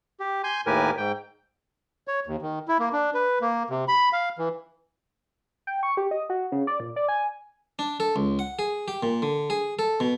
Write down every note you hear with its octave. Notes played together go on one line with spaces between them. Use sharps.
G4
G#5 C6 G6
D#2 A2 G4 A#4 B4 G#5
G#2 G5
C#5
D#2
D#3
E4
A#3
D4
B4
A#3
C3
B5
F5
E3
G5
C#6
G4
D#5
F#4
C#3
D5
A#2
D5
G#5
D4
A4
C#2
F#5
G#4
G4
A#2
D3
G#4
A4
B2